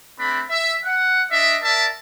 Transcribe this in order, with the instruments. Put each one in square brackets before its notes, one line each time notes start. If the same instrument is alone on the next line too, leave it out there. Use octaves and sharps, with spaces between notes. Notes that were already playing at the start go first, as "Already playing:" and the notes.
[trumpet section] A3 C4 D4 B5
E5
F#5
D4 D#5 E5
A#4 D5 E5 A5